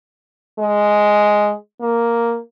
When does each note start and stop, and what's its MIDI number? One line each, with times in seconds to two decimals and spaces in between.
0.59 1.53 56
1.81 2.38 58